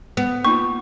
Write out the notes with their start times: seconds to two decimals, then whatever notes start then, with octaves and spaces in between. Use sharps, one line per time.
0.17 B3
0.45 A#3 D#4 F4 C#6